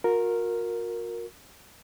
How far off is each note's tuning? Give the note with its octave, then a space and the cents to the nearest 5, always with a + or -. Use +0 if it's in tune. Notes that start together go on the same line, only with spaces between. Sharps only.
F#4 -45 A#4 +0